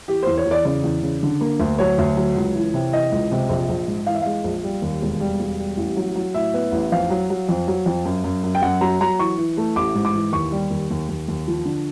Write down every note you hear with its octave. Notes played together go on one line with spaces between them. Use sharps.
E3 G4
E2 C5
C#5
E2
D5
C#3 D5
E2
C#3
D3
A#3
D2
F#3 C#5
D2
F#3
C#2
E3
C3
E3 D#5
C#2
C3
A#1
A#1
G#2
E3 F5
E5
G#3 F5
A#1
G3
D#2
E1
G3
E1
G3
A1
F#3
F#3
A2 E5
B3
A1
F2 F5
F#3
F#3
F2
F#3
F2
F#2
F#2
F#2
G5
F#2 F#5
F#3 A#5
F#3 A#5
E3 C#6
E3
A3
A1 D6
G#2
D6
E3
D#2 C#6
G3
D#2
D#2
D#2
D#2
F3
D3